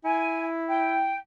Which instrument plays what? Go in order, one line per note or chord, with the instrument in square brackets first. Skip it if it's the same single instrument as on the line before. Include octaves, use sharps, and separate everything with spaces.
[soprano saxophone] E4 [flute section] G#5
[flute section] G5